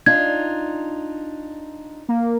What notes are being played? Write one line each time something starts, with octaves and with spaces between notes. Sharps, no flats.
D4 D#4 F4 G#6
A#3